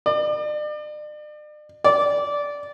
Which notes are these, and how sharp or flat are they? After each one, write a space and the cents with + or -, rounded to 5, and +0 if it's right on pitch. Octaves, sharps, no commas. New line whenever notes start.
D5 +40
D5 -15